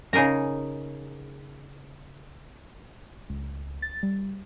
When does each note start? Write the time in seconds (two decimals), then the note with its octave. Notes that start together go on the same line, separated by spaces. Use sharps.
0.13 C#3 D#4 G#4 A#4 A#5
3.29 C#2
3.82 A6
4.03 G3